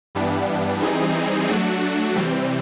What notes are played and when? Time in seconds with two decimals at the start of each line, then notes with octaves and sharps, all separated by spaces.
0.15 G2 E3 G3 B3 D4
0.82 E3 G3 C4 D#4 G#4
1.48 F#3 A3 D4 F#4
2.15 C3 E3 G3 C4